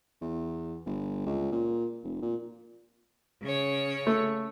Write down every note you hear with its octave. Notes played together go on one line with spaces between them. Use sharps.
E2
G1
C#2
A#2
F1
A#2
C#3 C#5
A3